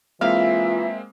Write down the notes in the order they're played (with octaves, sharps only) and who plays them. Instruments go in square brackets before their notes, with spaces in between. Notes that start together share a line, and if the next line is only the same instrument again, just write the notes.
[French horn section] E3 F4 [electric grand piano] G#3 A#3 C4 [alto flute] E5 [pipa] F5